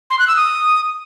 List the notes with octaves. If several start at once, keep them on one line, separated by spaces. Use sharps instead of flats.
C6
F#6
E6
D#6